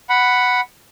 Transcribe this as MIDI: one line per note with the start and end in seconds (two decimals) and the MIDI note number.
0.09 0.61 78
0.09 0.61 83